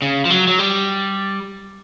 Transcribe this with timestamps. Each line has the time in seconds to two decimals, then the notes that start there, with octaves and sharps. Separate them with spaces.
0.02 C#3
0.25 F3
0.30 F#3
0.48 F#3
0.59 G3